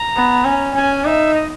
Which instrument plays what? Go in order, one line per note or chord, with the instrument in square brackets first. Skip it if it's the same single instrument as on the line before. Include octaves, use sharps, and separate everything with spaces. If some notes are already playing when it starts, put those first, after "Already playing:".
Already playing: [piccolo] A#5
[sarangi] B3
C#4
[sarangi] C#4 [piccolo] G#5
[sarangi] D#4 [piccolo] E5
[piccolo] D#5